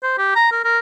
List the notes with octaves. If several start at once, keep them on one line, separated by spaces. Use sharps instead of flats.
C5
G4
A#5
A#4
A#4